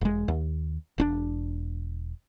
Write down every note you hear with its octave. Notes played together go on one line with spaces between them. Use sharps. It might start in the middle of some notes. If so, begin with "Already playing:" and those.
E1 G#3
D#2
E1 C#4 D4